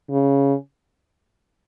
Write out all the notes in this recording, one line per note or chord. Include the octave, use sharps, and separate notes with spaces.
C#3